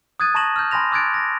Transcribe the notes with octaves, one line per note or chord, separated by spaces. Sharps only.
D#6 F#6 G#6 A6 D#7
A5 A#5 C#6 A#6 E7 F#7
F6 G6
G#5 B5 C6 A#6 F7
D6 E6 F#6 G#6 A6 D7
A#6